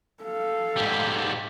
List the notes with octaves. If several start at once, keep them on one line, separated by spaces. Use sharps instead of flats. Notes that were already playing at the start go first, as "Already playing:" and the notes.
A4 F5
G#2 G3